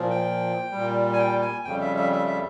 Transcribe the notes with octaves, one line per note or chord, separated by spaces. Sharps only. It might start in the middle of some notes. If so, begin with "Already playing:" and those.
Already playing: A#2 F3
G5
A#2 G3
G#5
G5
G#5
F2 C#3 G3 G5
E5
E5
E5
E5